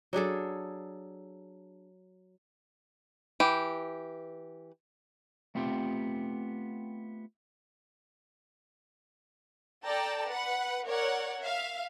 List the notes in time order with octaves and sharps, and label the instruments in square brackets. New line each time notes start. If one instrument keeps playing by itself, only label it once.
[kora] F#3 D4 G#4 A4
[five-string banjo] E3 G4
[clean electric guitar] A3 B3 C4 F4 G4
[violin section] A4 D5 G5 A5 A#5
B4 F#5
A#4 C#5 D5 F#5
E5 F5